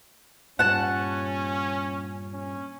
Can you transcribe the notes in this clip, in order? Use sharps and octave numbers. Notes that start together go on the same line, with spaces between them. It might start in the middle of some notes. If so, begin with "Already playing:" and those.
G2 A#2 C#4 F#5 A5
C#4